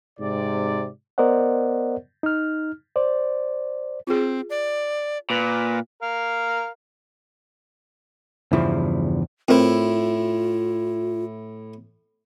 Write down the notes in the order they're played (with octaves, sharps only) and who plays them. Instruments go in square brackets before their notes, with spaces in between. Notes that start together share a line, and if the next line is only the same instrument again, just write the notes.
[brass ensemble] G#2 C3 D5
[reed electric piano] B3 A#4 C5 D5 D#5 F#5
D#4 F6
C5 D5
[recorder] C4 [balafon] F4 G#4
[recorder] D5
[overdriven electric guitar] A#2 [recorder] B4
[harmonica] A#4 F5
[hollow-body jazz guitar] E2 G2 C#3 F3 E4
[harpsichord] A2 E4 [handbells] C4 A#4 C5 [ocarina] F4